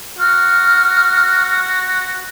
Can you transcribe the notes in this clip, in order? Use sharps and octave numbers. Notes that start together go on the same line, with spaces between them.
F#4 F6